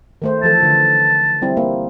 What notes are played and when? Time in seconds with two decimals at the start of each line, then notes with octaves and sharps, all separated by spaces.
0.22 D#3 A3 C5
0.43 E3 F3 A4 A5
0.63 D3
1.42 G3 C4 E4
1.57 A#3